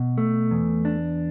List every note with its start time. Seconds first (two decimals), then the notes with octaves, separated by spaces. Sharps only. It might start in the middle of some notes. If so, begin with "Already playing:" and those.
Already playing: B2
0.18 A3
0.51 E2
0.85 D4